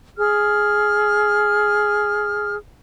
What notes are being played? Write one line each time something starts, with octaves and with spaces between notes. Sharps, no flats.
G#4 F6